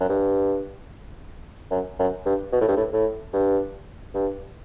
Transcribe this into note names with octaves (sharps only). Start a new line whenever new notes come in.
F#2
G2
F#2
F#2
G2
B2
A2
G2
A2
A2
G2
G2